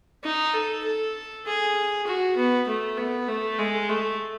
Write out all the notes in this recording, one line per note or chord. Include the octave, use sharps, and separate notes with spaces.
D#4
A4
A4
G#4
F#4
B3
A3
B3
A3
G#3
A3